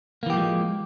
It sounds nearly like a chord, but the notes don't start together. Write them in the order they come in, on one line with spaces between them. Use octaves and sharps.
A#3 E3 G4 F3 G#3